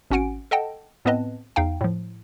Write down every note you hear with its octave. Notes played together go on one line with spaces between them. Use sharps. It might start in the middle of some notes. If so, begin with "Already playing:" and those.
G#1 C#4 F#4 F#5 G#5 D7
A4 D#5 F#5 G5 A5
A2 B3 C4 B4 D#5 A5
E2 D#4 F5 G5
A2 F3